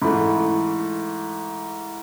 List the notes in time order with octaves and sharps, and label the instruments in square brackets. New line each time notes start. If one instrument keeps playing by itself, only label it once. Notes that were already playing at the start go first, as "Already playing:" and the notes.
[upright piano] G#2 E3 A3 B5